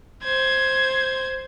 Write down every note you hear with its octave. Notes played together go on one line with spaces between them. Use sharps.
C5 G#6